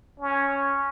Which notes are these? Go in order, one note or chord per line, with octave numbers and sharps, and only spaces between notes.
C#4